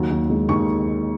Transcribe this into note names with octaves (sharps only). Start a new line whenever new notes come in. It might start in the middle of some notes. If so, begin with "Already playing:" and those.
Already playing: D#2 F#3
D#2
G#3
D#2 C#6